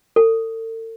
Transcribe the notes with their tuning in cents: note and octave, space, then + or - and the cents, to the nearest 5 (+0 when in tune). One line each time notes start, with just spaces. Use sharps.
A4 +40